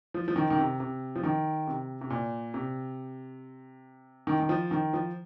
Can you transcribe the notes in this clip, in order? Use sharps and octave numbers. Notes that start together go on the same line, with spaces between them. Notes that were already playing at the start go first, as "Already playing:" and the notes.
F3
F3
D#3
D#3
C3
C3
F3
D#3
C3
C3
A#2
C3
D#3
D#3
F3
D#3
F3